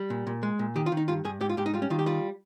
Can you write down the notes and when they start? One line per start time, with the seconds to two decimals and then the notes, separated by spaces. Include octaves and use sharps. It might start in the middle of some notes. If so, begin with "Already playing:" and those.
Already playing: G3
0.10 A#2
0.27 A#2
0.43 G#3
0.59 A#2
0.76 D#3 G4
0.86 F4
0.92 D#3
0.97 D#4
1.08 G2 F4
1.25 G2 G#4
1.41 G#2 G4
1.49 F4
1.57 G#2 G4
1.66 D#4
1.74 G3 F4
1.82 C#4
1.90 D#3 F4
1.99 G4
2.06 G3 F4